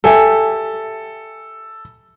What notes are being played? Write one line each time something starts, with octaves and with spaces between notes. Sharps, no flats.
G4 A4 E5 G#5